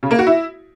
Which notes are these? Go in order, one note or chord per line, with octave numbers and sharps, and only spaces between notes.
C#3
A#3
F#4
E4